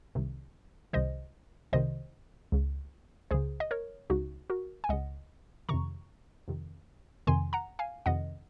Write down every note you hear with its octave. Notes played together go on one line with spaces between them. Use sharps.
C2 C3 D#3
C2 C3 D#3 C5 D#5
C2 C3 D#3 C5 D#5
C#2 C#3
C#2 C#3 G#4 C5
D#5
A#4 C#5
C#2 C#3 D#4 F#4
F#4 A#4
G#5
C#2 C#3 D#5 F#5
F2 C3 D#3 A#5 C#6
F2 C3 D#3
F2 C3 D#3 G#5 C6
F#5 A#5
F5 G#5
F2 C3 D#3 D#5 F#5